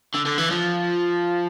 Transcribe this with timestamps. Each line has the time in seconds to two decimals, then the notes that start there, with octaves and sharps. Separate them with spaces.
0.15 D3
0.26 D3
0.38 E3
0.50 F3